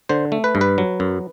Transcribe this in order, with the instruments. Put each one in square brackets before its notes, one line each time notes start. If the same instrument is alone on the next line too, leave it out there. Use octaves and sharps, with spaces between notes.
[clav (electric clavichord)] D3 C5
A3
B4
G2
B4
F#3
F#2